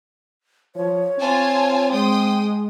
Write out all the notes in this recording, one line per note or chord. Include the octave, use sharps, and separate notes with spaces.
F3 C#5
C4 F4 G#5 A5
G#3 G5 C6 D#6